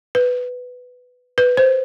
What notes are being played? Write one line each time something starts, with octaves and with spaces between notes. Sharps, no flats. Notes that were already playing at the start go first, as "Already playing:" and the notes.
B4
B4
C5